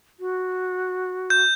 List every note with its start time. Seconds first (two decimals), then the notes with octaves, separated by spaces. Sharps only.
0.20 F#4
1.30 G6